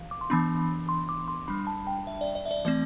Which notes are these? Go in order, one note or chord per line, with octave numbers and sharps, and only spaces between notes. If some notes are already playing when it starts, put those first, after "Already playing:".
Already playing: E3 F5
D6
C6
E3 B3 D4 B5
C6
D6
C6
G3 D4 B5
A5
G5
E5
D5
D5
E5
D5
E3 A3 C4 D5